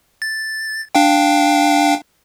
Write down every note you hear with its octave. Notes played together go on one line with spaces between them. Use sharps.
A6
D4 F5 G5